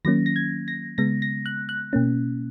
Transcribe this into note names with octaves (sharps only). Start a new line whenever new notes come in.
D#3 F#3 A#3 C#4 A#6
A#6
G#6
A#6
C#3 G#3 B3 A#6
A#6
F#6
F#6
B2 A#3 C#4